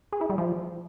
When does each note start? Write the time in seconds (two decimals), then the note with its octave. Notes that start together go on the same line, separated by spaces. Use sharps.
0.12 G#4
0.21 E4
0.30 G3
0.38 F3